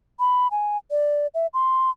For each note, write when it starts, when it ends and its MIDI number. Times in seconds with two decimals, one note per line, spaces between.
0.20 0.48 83
0.51 0.77 80
0.91 1.27 74
1.34 1.47 76
1.54 1.90 84